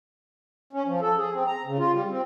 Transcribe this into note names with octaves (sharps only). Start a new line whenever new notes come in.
C#4
F3
A4
G#4
C4
A#5
C#3
F4
G3
C4